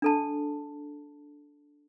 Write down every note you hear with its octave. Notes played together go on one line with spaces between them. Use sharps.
D4 A4 A5